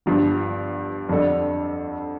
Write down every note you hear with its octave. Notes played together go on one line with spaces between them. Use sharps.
G1 G2 F3
F2 D3 G3 D4 A4